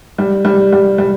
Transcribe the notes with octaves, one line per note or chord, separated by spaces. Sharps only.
G3
G3
G3
G3